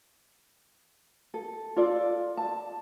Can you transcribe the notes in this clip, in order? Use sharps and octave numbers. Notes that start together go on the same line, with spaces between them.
A4
F4 A4 D5
A5